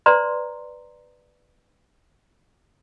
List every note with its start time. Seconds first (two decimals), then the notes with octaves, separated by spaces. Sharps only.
0.06 B4 C5 D5 A#5 C6